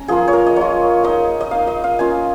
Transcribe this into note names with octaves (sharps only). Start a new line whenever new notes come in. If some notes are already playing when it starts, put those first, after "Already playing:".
Already playing: C#4 A#5
F3 A#3 F4 G#4
C#5
A#4
D#5
A#3 F4 C#5
A#3 D#4 D#5
D#5
A#3 D#4 F5
D#5
F5
A#3 C#4 F4 G#5